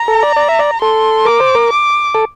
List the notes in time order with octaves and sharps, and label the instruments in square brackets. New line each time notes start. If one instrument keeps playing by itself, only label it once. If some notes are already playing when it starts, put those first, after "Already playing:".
Already playing: [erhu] A#5
[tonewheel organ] A4
D5
D5
E5
D5
[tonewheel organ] A4 [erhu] C6
[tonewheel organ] A#4 [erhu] D6
[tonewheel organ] C5
A#4
[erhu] D6
[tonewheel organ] A4